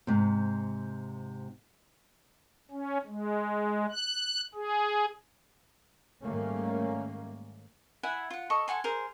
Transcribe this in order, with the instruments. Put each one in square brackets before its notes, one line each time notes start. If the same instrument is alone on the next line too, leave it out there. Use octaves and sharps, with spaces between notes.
[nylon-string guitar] G#2 C3
[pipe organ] C#4
G#3
F#6
G#4
[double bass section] G#2 D#3 G3 A3 A#3 C#4
[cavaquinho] E4 E5 F#5 G#5
F4 F#5
A4 D#5 C#6
A4 F#5 G#5 C6
G#4 A#4 C5